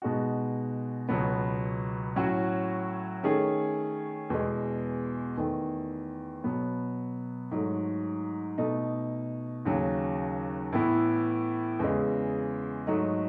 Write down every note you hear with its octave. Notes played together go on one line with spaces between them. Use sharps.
B2 G#3 D#4 F#4
C#2 B2 F#3 B3
A2 F#3 C#4 F#4
D#3 A3 C#4 G#4
E2 B2 G#3
E2 D#3 A3
B2 F#3 B3
G#2 F#3 A3
B2 A3 D#4
D#2 C#3 F#3
A2 E3 B3 E4
E2 C#3 G#3
G#2 F#3 A3 D#4